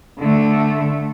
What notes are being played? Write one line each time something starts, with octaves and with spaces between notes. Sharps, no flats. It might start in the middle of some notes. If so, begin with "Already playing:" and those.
D3 A3